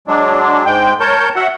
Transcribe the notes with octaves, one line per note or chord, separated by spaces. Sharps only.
F#3 G#3 D4
G#2 G#3 G5
A#4 C#5 A5 G6
F#4 E5 F#5